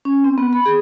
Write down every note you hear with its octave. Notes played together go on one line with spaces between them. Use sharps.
C#4
C4
B3
B5
G#4